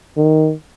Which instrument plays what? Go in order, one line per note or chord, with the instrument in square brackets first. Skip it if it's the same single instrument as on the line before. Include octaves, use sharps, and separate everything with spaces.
[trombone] D#3